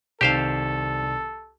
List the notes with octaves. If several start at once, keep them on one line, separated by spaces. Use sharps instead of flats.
C2 D#3 G4 A4 C5 F5